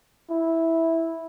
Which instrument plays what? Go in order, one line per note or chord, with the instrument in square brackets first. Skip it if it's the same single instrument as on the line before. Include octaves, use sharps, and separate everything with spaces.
[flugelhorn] E4